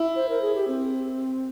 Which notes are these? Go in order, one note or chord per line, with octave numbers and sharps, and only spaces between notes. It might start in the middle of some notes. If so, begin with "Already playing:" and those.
Already playing: E4
C5
A#4
G#4
G4
C4